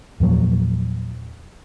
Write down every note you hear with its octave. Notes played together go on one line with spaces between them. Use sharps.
E2 A#2 F3 F#3